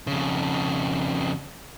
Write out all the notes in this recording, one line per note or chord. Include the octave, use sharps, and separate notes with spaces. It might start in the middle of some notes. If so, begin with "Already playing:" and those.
F2 C#3